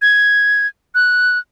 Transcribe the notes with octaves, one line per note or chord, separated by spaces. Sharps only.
G#6
F#6